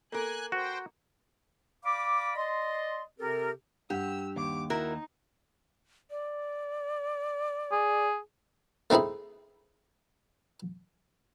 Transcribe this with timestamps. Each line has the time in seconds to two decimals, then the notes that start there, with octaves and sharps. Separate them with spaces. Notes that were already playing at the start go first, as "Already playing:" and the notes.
0.12 A#3 A4 A#4 G#5 F#6
0.52 F#4 C5 G5
1.84 D5 F5 B5 D6
2.36 D5 D#5 C6
3.19 C3 C4 G4 A4 A#4
3.90 G2 G4 F#5 E6
4.36 D#2 D6
4.70 D#4 E4 F#4 A#4
6.11 D5
7.72 G#4
8.90 A3 C4 D#4 E4 G#4